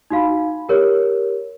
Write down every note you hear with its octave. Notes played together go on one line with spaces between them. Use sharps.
D#4 F#4 F5 B5
G4 A#4 C#5